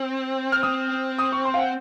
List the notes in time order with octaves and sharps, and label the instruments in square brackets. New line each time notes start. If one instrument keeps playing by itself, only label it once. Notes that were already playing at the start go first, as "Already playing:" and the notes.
Already playing: [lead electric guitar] C4
[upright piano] F6
[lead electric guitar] C4 [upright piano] D#6
[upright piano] D#6
C#6
C6
F5
F#5